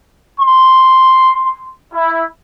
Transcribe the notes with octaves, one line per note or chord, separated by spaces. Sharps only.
C6
E4